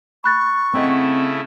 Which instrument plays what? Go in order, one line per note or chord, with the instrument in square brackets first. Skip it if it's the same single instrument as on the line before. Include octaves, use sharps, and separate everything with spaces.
[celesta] B5 F#6 A6 [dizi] C#6
[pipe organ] C#3 A3 E4 [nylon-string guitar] C4 D#5 F#5